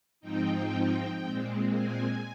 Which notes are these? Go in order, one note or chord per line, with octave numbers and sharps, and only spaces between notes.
G#2 F3 C4 D#4 G5
A#2 G#3 C4
G#5